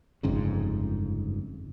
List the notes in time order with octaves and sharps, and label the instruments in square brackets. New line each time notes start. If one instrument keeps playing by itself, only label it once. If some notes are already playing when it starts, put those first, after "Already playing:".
[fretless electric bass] G1 F2 G#2 C#3